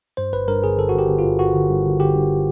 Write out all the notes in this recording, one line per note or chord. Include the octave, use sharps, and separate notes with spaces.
G2 C5
G1 B4
G2 A#4
G1 G#4
G1 A4
G1 F#4
G4
G1
F4
G1
G1 F#4
D3
G2
G1
D3 G4
G2